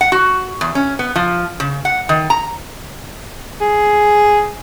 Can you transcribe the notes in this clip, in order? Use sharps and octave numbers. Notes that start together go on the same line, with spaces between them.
F#5
F#4
E2
C#4
B3
F3
C#3
F#5
D#3
A#5
G#4